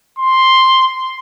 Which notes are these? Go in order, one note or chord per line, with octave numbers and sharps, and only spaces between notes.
C6